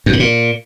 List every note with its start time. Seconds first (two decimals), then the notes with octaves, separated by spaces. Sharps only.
0.06 F#2
0.13 G#2
0.20 A#2